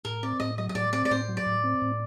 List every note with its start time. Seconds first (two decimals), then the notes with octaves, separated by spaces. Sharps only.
0.05 A2 A#4
0.23 C4 D5
0.40 A2 D#5
0.58 F#3 D#5
0.69 D#5
0.75 A2 D5
0.93 C4 D5
1.05 D5
1.11 A2 C5
1.28 F#3
1.37 D5
1.46 A2
1.64 C4
1.82 A2